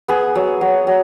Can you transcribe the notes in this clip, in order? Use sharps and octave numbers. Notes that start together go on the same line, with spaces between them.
B3 G#4
F#3
F#3
F#3